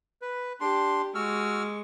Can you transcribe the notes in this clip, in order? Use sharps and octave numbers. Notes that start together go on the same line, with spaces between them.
B4
D4 G4 C6
G#3 F#4 C#6 E6 F6